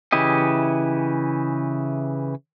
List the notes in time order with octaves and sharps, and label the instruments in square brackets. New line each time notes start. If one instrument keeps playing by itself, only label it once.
[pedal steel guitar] C#3 E3 E4 G4 D#5